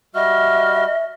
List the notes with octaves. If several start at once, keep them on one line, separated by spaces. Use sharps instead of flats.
G3 F#4 D#5 E5 F6